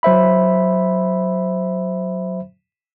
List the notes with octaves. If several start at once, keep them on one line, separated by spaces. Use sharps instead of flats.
F#3 C5 E5 B5